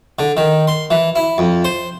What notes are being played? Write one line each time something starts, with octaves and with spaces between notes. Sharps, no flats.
D3
D#3
C6
E3
E4
F2
C5